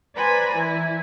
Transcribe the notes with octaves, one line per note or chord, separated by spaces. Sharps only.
B4 C5 D5 G#5 A#5 B5
E3 E4